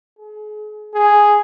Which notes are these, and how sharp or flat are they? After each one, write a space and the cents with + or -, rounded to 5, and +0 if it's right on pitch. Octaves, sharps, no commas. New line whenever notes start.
G#4 +35
G#4 +0